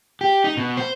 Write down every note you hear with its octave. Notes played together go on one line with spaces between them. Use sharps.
G4
D#4
B2
C5